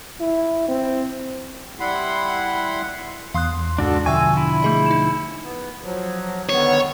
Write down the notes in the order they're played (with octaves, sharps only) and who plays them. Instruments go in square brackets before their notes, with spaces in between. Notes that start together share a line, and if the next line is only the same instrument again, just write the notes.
[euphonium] E4
C4
[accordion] G3 E4 F#5 B5 C6
[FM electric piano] E2 C6 [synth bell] F5 D#6 F#6
[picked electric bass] C#2 G#2 [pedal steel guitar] D4 F#4 A4
[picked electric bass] B2 D3 F3 [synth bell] E5 G5 C#6 [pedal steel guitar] G#5 E6
[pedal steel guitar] E4
[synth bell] A3 G#4 D#5
D#4 E7
[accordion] B3
F3 F#3
[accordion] D3 D#3 B3 [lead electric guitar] C#5